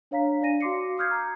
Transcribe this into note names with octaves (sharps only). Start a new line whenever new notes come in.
D4 C#5 F5 A#5 B6
D4 D5 G#5 A#6 D#7
F#4 F5 C6 D6 C7 C#7
D6 D#6 F6 G6 G#6 C7
A#5